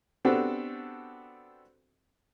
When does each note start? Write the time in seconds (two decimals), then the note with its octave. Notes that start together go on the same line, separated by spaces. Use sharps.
0.25 B3 C4 D4 F#4 G4 A4